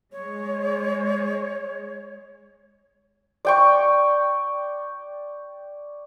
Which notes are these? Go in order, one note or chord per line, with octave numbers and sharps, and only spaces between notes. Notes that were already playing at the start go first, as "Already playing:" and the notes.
G#3 C#5
D5 G5 C#6